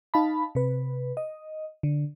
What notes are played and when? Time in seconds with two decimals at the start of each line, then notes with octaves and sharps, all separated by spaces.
0.14 D#4 F5 A5 B5
0.55 C3 B4
1.17 D#5
1.83 D3